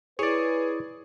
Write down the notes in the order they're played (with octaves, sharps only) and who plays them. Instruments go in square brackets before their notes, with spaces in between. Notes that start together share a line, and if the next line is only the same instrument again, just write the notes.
[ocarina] E4 [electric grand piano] G#4 [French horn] B4 [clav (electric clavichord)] C#5 D5